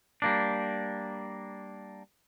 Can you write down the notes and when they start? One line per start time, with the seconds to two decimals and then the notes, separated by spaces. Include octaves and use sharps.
0.22 G3 A#3 D4